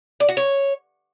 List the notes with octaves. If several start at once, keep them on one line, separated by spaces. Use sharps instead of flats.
D5
F#4
C#5